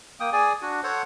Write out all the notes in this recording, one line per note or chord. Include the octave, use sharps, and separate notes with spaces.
A#3 G5 D#6
G#4 D5 G#5
D4 F#4
A4 C5 C#5 F#5